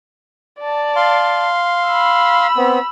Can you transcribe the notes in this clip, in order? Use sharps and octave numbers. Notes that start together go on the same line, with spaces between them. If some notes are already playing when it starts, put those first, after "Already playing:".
D5 A5
F5 C6
B5 E6
B3 C4